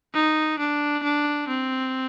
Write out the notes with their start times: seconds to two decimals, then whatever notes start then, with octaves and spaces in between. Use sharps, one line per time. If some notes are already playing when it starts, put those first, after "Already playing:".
0.14 D#4
0.59 D4
1.03 D4
1.48 C4